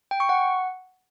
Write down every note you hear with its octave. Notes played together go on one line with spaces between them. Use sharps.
G5
C#6
F#5